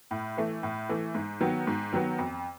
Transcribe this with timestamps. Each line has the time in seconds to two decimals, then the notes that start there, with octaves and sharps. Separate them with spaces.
0.11 A2
0.37 E3 A3
0.63 A2
0.89 E3 A3
1.15 G#2
1.41 D#3 F#3 B3
1.67 G#2
1.93 D#3 F#3 B3
2.19 F2